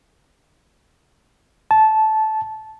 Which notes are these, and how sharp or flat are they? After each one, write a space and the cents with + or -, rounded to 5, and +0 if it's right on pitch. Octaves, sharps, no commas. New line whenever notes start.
A5 -15